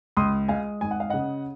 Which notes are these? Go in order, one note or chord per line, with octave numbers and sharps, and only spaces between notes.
C#2 C6 D#6
G#3 F5 G#5
G#1 G#5
F#5
F5
C#3 D#5 F#5